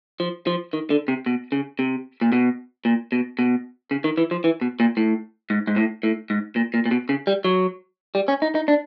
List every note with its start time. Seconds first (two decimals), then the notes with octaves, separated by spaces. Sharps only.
0.20 F3
0.47 F3
0.73 D#3
0.90 D3
1.08 C3
1.26 B2
1.52 C#3
1.79 C3
2.21 A#2
2.32 B2
2.85 A#2
3.12 B2
3.39 B2
3.91 C#3
4.04 D#3
4.18 E3
4.31 F3
4.44 E3
4.61 B2
4.80 A#2
4.97 A2
5.50 G#2
5.67 G#2
5.76 A2
6.03 A2
6.30 G#2
6.56 A#2
6.74 A#2
6.86 A#2
6.91 B2
7.09 C#3
7.27 G3
7.45 F#3
8.15 G3
8.28 C#4
8.42 D#4
8.55 D#4
8.68 D4